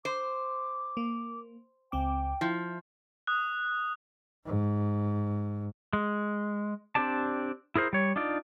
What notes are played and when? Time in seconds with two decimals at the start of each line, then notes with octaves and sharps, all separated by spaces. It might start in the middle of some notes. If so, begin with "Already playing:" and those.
0.05 C5 D6
0.97 A#3
1.92 C#2 C4 G5 D6
2.41 F3 E4
3.27 D#6 F#6
4.45 G#2
5.93 G#3
6.95 C4 D4 G4 D5 A5
7.76 E4 G#4 A#4 C5
7.93 G3 C#5
8.16 D4 D#4 F4 D5